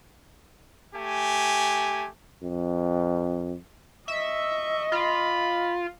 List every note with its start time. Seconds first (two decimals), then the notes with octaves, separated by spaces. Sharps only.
0.95 A3 G4 G#5
2.43 F2
4.08 D#5 E5 C#6
4.92 F4 B5